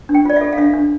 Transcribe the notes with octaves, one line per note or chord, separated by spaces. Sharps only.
D4
G5
F4 D5
A4 E5
F5
D4 E5
D4